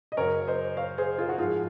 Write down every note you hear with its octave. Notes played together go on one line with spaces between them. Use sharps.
D#5
F#2 C#3 F#3 A#4 C#5
C5 D#5
C#5 F5
G#4 C5
F4 G#4
F#4
G#2 F3 G#3 F4 G#4